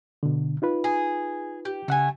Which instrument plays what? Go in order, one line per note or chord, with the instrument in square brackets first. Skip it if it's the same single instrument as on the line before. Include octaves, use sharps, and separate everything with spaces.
[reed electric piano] B2 D3
D#4 F4 B4
[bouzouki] G#4
G4
[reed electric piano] C#3 F#5 [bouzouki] A3 G#5